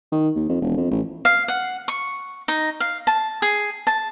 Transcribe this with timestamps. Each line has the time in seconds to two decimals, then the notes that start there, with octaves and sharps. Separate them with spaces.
0.12 D#3
0.35 D#2
0.49 F2
0.62 E1
0.77 F2
0.91 A1
1.25 F5
1.48 F#5
1.88 C#6
2.48 D#4
2.80 F5
3.07 A5
3.42 G#4
3.87 A5